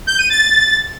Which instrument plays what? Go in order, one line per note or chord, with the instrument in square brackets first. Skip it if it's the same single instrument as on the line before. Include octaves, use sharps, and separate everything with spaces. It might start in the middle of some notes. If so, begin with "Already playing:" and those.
[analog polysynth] G6
D#7
A6